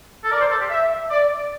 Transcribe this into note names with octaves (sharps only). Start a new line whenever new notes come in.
A4
A#4 D5
C5
A4
G4
E5
D5